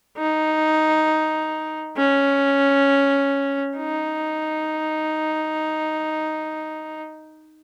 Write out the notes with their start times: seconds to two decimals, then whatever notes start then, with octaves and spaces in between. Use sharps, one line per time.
0.17 D#4
1.98 C#4
3.77 D#4